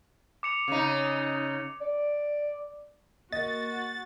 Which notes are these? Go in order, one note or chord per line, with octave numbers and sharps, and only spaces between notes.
D6 C#7 F7
C#3 D#4
D5
A#3 F#4 D#5 A6